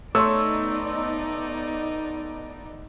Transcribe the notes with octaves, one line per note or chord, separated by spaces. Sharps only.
A3 B3 D#4 C#5 D5 C6 E6